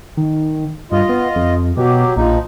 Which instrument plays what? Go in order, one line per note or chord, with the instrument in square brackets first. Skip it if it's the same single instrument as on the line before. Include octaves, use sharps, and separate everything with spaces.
[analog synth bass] D#3
[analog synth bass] G2 [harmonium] F4 D#5
[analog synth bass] B3
F2
[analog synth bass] B2 [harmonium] F#3 G4
[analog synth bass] A#1 [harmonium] F3 D#4